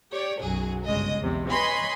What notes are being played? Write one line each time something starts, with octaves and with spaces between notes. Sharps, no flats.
G4 C#5 D5
B1 F#2 F#3 G#4
G1 C#3 G#3 D#5
B1 E2 G2 C3
B4 C#5 D#5 G#5 B5 C6